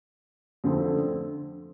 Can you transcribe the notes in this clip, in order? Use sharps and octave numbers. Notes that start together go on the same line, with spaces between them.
F2 D3 A3 C4